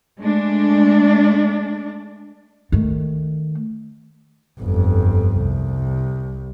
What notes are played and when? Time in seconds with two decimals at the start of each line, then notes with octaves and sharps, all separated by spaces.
0.20 G#3 A3 D4
2.72 D#3 A3
4.61 G1 F2
5.38 C2